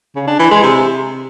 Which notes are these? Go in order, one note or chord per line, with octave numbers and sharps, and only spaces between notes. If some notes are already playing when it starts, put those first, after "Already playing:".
C#3
D4
E3
G#3
C3